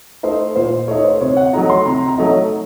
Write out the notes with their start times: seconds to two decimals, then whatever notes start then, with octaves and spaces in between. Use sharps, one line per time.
0.23 A3 D#4 C5
0.56 A#2 C5
0.88 A3 D#4 C#5
1.04 C5
1.21 C3 C#5
1.37 F#5
1.53 F#3 A3 D#4 A#5
1.70 C6
1.86 C3 A#5
2.08 A#5
2.18 F#3 A3 D#4